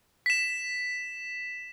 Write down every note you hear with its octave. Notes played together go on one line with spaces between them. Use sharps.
B6 E7